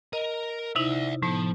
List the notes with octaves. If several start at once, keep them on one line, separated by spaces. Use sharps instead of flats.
A#4 D#5
C3 D#4 E4 D5 E5
A2 F3 B3